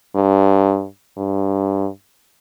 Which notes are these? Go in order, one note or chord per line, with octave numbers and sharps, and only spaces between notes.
G2
G2